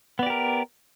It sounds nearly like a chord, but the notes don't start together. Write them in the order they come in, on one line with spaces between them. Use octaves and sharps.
B3 D5 G4 A#4